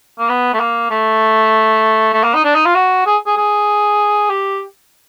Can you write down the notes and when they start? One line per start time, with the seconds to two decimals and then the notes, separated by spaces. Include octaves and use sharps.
0.19 A#3
0.29 B3
0.54 A3
0.60 A#3
0.91 A3
2.13 A3
2.24 A#3
2.35 D#4
2.45 D4
2.55 D#4
2.66 F4
2.75 F#4
3.06 G#4
3.27 G#4
3.37 G#4
4.30 G4